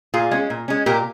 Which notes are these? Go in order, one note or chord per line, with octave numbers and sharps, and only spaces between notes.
A#2 F4 G#4
G#3 C#4
A#2
G#3 C#4
A#2 G4 A#4